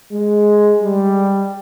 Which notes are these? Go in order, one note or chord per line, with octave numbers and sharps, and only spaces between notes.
G#3
G3